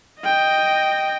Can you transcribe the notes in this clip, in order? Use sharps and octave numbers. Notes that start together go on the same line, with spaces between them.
D#5 G5